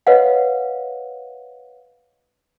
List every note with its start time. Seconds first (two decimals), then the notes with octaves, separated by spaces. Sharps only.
0.07 B4 C#5 D#5 F5 F#5